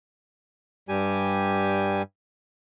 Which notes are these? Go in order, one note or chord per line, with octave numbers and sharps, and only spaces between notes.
G2 G3 G4 G#5